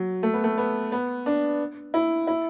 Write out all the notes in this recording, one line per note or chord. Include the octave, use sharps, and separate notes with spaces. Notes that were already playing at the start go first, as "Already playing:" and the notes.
Already playing: F#3
A3
B3
A3
B3
B3
D4
E4
E4